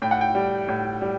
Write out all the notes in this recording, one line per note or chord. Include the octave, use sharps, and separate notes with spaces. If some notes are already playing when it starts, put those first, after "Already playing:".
A2 G5
F#5
G5
G3
A2
G3